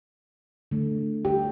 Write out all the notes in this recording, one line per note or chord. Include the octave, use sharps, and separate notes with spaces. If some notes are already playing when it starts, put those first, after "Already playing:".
D3 A3
G4